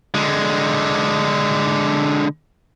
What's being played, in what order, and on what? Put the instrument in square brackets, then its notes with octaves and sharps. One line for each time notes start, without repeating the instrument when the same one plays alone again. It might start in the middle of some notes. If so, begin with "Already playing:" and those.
[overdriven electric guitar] D3 G#3